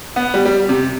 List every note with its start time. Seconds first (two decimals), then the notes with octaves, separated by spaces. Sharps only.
0.16 B3
0.34 G3
0.45 G3
0.69 C3